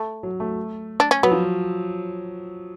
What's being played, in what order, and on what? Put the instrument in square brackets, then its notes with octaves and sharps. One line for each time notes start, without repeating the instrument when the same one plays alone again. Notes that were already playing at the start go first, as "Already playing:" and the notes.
Already playing: [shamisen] A3
[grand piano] F#3
A3
[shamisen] D4
C#4
[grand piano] F#3 [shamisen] B3
[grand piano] F3